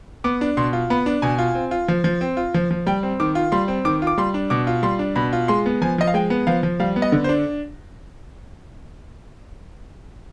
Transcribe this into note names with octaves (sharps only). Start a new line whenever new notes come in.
B3 D6
D4
B2 C6
F4
B3 B5
D4
B2 G#5
F4
C4
F4
F3
F3
C4
F4
F3
F3
G3 G5
C4
D#3 D6
F4
G3 C6
C4
D#3 D6
F4
D6
G3 C6
D4
B2 D6
F4
G3 C6
D4
B2 B5
F4
G#3 C6
B3
F3 G#5
F3 D#5
F5
G#3 G5
B3
F3 F5
F3
G3 F5
B3
D#5
D3
C5
D4